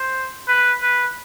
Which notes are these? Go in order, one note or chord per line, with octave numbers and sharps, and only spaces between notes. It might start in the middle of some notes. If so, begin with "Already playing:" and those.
Already playing: C5
B4
B4